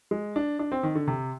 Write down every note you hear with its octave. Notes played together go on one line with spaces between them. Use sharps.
G#3
D4
D4
C4
D#3
D3
C3